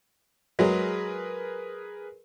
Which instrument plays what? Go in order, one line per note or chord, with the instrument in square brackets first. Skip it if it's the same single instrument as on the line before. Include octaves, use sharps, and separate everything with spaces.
[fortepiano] F#3 G#3 [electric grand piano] G#4 A#4 B4